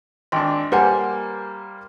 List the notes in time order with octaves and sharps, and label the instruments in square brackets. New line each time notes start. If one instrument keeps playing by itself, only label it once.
[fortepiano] G#1 D4 [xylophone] G5 C6
[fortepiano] G3 A#3 C5 [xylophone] B4 F#5 G#5